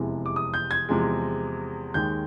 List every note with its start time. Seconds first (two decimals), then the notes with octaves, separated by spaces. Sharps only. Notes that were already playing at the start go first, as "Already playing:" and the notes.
Already playing: F1 E2 C3 E3 G#3
0.26 D6
0.36 D#6
0.54 G6
0.71 G#6
0.89 E2 C3 F3 G#3
1.94 D#2 D#3 G#3 G6